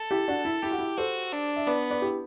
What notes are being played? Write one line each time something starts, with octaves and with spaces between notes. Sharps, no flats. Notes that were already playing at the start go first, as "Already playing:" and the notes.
Already playing: A4
E4 G4
D4 F#4
E4
E4 G4
F#4
E4
F#4 A4 C5
D4
E5
B3 B4 D5
B4 D5
E4 G4